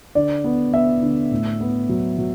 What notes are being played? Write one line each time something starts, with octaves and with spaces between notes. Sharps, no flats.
D3 D5
B3
B3 E5
D3
A2
B3
F#3
F#3